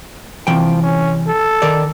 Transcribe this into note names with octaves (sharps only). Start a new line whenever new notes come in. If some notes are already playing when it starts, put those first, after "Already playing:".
C3 E3 F3 G5
C#4
A4
D#3 A#4 D5